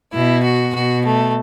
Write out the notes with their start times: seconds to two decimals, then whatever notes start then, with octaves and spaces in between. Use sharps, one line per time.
0.13 B2 E4
0.44 F#4
0.74 B2 F#4
1.04 A3